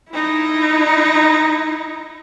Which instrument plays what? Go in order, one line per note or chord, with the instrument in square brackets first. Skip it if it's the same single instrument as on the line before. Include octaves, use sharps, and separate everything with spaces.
[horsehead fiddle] D#4 E4